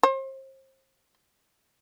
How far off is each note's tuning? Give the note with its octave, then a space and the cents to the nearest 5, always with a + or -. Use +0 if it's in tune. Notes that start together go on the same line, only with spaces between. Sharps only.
C5 +35